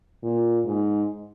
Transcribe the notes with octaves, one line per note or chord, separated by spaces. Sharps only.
A#2
G#2